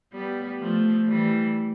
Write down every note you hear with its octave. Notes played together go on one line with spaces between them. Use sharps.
G3 B3
F3 A3
E3 G3